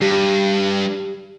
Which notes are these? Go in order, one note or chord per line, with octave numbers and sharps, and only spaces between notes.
G2 G4